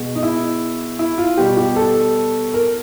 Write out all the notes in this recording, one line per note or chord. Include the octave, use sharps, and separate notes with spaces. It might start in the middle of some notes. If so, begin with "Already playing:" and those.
Already playing: B2 G#3
D#4
E4
E4
F4
B2 G3 G4
G4
A4
A#4